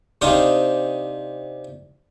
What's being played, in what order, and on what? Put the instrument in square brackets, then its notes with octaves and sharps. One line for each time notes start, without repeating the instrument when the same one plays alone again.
[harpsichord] C3 C4 D4 D#4 F5 D#6